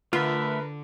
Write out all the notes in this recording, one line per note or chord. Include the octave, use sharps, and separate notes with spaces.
D3 A3 F4 A#4 B4 E5